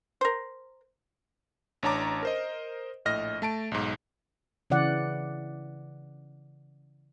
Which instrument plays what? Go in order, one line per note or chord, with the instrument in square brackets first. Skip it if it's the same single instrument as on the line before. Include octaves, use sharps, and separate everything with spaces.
[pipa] A#4 C5
[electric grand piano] A1 D4 C#5 A5 A#5 D6
A#4 C5 D#5
A#1 A2 D#5 F6 A#6
A3 A5 D7
B1 G#2
[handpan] C#3 E3 D5 F#5